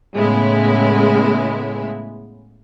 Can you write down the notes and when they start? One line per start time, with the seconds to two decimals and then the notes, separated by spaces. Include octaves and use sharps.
0.15 A2 C#3 G#3 B3 E4